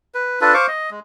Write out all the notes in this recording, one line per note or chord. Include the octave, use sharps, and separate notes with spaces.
B4
D4 F4 A4 B4
C5 F5 C#6 D6
D#5
G#3